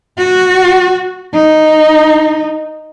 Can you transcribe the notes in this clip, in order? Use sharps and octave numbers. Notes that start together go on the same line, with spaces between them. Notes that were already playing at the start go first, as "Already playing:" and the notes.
F#4
D#4